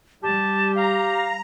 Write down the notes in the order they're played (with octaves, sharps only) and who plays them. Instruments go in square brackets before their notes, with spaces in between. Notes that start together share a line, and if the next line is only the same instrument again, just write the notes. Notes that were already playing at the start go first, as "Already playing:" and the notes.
[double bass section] G3 [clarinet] G4 [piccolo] A5
[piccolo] F5 [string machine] A#5